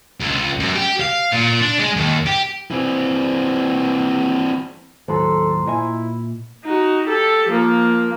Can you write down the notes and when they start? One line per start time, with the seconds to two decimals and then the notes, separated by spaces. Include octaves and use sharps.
0.20 C#2
0.60 F#2
0.76 G4
1.01 F5
1.32 A#2
1.61 D4
1.79 G#3
1.96 D#2
2.26 G4
2.71 E3 C4
5.08 D#2 A2 F#3 A4 C5 A#5 C6
5.67 A#2 E4 D#5 G#5
6.65 D#4 F#4
7.07 G4 A4
7.49 F3 A#3